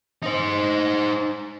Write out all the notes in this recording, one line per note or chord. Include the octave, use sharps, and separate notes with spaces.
D#4 C5